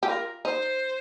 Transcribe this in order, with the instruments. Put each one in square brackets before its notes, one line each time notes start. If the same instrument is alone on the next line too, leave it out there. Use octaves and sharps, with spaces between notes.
[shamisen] G4
[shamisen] F4 [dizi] A#4
[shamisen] D#4 [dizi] C5